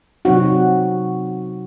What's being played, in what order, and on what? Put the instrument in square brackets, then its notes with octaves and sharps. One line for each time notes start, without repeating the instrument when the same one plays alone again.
[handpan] C3 F#3 C4 D#4 F#4